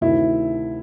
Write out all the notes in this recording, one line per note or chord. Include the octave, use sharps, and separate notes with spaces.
D2 C3 D#3 E4